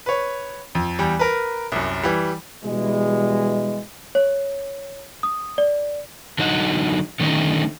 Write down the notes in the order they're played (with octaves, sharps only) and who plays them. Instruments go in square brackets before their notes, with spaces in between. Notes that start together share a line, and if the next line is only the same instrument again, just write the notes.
[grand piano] B4 C#5
F2
E2 G3
A#4 B4
C2 F#2
E3 G3
[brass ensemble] B2 E3 G3 G#3
[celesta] C#5
D#6
D5
[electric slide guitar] D3 F#3 D#4 F#5
D3 D#3 A3 C#4 D#4